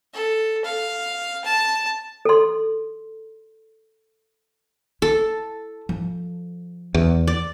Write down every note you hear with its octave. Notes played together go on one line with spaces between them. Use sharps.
A4
F5
A5
A4 C6
E4 A4
F3
E2
D5